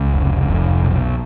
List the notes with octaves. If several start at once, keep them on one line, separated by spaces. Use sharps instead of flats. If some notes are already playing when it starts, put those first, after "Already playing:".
Already playing: C#2
F1
F1
B1